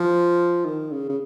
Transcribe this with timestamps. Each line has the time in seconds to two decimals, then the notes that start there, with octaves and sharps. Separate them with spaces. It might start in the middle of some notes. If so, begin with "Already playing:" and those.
Already playing: F3
0.65 D#3
0.92 C#3
1.09 C#3